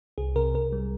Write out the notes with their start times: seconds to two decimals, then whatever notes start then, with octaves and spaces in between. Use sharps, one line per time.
0.18 C2 G#4
0.36 C3 A#4
0.55 C2 A#4
0.73 G3